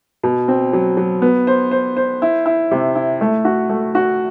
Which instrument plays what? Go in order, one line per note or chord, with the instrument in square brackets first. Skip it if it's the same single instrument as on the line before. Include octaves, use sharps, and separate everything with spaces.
[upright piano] B2
C4
F#3
F#3
B3
C5
C5
C5
E4
E4
C3
E4
A3
F#4
A3
F#4